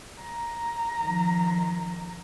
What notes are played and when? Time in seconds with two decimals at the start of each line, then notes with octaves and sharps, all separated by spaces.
0.22 A#5
1.00 D#3 F3